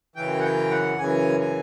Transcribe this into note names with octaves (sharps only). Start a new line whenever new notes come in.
F#2 C#3 E3 G5
F#5
G5
F#5
F#2 C#3 E3 G#5
G#5